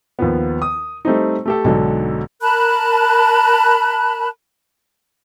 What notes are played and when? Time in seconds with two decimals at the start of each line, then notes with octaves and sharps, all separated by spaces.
0.19 D#2 F3 B3
0.62 D#6
1.05 G3 A3 C4 D#4
1.46 A3 G4 A4
1.64 B1 G#2 D3 F#3 A4
2.42 A#4 A5 B5 F#6